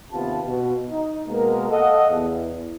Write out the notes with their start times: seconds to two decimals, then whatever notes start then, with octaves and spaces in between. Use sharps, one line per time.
0.12 D#2 C3 B3 F4 A5
0.46 B2
0.90 D#4
1.27 B2 G#3 A#3 A#4
1.70 A4 D#5 F5 F#5
2.10 E2